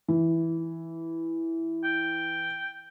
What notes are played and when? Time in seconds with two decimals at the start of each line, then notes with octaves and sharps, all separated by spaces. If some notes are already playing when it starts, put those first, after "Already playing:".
0.08 E3
1.84 G5